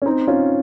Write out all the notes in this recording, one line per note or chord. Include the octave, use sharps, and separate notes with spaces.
C#4
C4 D#4
C#4 F4